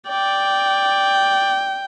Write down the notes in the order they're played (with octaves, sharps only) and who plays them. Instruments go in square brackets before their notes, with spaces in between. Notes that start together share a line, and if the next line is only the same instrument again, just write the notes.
[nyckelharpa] D5 [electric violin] G5